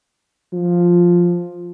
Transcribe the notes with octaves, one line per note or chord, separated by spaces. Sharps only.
F3